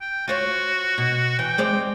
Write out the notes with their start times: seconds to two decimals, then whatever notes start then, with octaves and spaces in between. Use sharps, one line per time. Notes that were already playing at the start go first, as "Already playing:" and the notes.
0.01 G5
0.28 F4 F#4 C5 C#5
0.98 B2
1.39 E3 G5
1.58 G#3 C4 D5